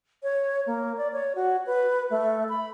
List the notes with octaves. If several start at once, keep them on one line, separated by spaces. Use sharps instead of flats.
C#5
A#3
D5
C#5
F#4
B4
A3
B5